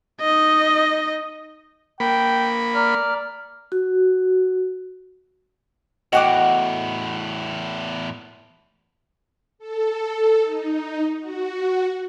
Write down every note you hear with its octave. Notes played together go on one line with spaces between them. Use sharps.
D#4 D#5
A#3 G5 B5
D5 A#5 F6
F#4
E2 A2 F#4 D#5 F#5 G5 D6
A4
D#4
F#4